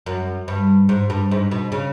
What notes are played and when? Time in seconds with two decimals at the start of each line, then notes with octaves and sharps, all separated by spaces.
0.06 F#2
0.48 G2
0.89 G#2
1.10 G2
1.31 G#2
1.51 B2
1.72 C#3